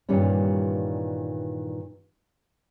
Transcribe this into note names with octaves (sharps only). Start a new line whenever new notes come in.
G2 A#2 D#3 E3 G3 C#4